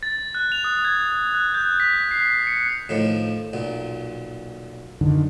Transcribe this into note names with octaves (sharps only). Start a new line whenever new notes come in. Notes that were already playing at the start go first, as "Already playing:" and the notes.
A6
F#6
F7
D#6
G#6
F#6
G6
B6
C7
C#7
A2 D#3 F3
B1 A#2
F#2 D3 D#3